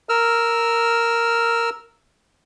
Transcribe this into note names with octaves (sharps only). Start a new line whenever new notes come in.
A#4 E6 F6